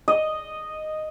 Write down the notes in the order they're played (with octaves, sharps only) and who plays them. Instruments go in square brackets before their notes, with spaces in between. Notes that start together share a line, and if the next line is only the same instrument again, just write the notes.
[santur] D#5